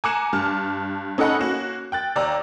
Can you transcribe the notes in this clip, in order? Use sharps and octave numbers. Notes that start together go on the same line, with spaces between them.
G#5 A#5 D6 F#6 C#7 E7
G2 A5 F6
C#4 D#4 A4 D#5 F#5 B5
A#3 C#4 F#4
G5 F#6 A6
D#2 D5 A#5 E6